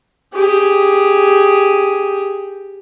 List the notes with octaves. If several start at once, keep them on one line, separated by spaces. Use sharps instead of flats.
G4 G#4